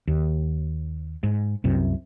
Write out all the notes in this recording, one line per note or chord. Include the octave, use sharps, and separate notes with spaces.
D#2
G#2
C2 F#2 C3